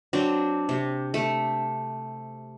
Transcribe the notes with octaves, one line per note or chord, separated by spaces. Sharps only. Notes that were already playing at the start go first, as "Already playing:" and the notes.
F#3 C4 D4
C3
A3